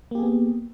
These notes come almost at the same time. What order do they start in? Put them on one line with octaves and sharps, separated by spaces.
A#3 G4 G#4 B3